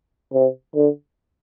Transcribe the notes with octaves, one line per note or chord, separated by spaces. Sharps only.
C3
D3